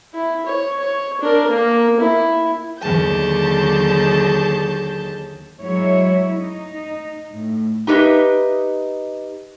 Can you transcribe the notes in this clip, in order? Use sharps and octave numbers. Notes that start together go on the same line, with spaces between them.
E4
C#5
C#5
D4 A#4
A#3
E4
D#2 D3 F#3 G#4 A5 G6
F#3 G#3 E4 C#5
D#4
A2
D#4 G4 B4 D#5 E5